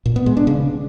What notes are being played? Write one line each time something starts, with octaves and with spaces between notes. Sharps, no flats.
A#2
B3
G#3
D4
C#3